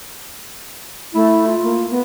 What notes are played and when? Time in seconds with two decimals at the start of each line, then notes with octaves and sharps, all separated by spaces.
1.15 A3 E4
1.47 F4
1.62 A#3
1.90 B3